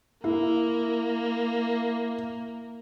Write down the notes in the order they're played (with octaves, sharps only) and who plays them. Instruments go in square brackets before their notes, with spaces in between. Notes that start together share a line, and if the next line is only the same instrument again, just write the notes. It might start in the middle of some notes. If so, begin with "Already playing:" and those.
[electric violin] A#3 [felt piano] E4